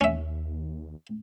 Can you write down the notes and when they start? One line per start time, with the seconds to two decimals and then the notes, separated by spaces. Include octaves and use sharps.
0.01 D#2 C#4 E5